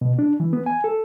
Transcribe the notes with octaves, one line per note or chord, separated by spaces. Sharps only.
B2
D4
E3
B3
G#5
A4